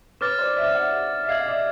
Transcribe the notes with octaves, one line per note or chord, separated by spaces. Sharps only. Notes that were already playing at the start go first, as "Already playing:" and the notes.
B4 C#5 D6 F6 A6
C5 D5
D5 E5
E5 F#5
E5
D#5 F5 E6 G#6 C7
F5
D5 E5